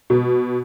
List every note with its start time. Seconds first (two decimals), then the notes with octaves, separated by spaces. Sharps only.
0.10 B2